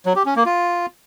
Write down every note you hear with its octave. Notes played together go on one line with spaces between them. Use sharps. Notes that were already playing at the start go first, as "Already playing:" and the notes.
F#3
G4
C#4
A#3
F4